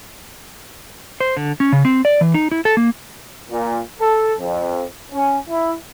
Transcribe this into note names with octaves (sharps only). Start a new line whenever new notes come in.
C5
D3
C#4
C#3
C4
D5
E3
D#4
E4
A4
A#3
A#2
A4
F2
C#4
E4